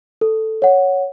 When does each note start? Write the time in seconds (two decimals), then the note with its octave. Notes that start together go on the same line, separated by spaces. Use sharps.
0.21 A4
0.62 C#5 F#5